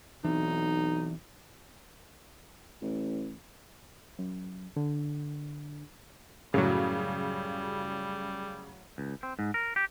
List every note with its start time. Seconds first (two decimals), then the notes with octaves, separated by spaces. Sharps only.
0.24 B1 E3 C4 D#4
2.82 A1
4.19 F#2
4.76 D3
6.54 F#2 A2 C#3 F#3 G3
8.98 C#2
9.23 C4
9.39 G#2
9.54 A#4
9.76 G4